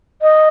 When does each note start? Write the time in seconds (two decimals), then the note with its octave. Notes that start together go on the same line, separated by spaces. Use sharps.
0.22 D#5